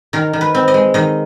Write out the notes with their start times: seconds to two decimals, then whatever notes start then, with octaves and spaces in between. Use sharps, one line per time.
0.13 D#3 A#4
0.33 D#3
0.41 B4
0.54 C4
0.68 D#5
0.74 G#3
0.94 D#3 D#5